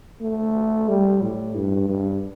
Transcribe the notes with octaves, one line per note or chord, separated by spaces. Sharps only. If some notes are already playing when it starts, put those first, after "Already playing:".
A3
G3
A2
G2
G2